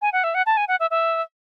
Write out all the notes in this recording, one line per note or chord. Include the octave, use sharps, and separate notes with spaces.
G#5
F#5
E5
F#5
A5
G#5
F#5
E5
E5